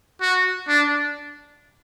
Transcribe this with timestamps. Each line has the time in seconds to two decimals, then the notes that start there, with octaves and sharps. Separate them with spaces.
0.21 F#4
0.68 D4